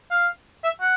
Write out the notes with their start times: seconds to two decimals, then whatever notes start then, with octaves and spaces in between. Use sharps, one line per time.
0.11 F5
0.64 E5
0.81 F#5